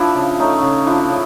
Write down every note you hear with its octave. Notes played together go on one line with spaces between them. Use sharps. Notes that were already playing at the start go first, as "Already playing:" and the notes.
Already playing: F3 D4 E4
C#3
A3 C#4 D#4
C#3
F3 D4 E4
C#3